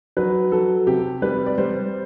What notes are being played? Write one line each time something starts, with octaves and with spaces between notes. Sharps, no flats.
F#3 B4
F#3 A4
C3 G4
G3 B4
D5
G3 C5